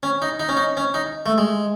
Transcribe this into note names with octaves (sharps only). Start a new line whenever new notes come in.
C#4
D#4
D#4
C#4
D#4
C#4
D#4
A3
G#3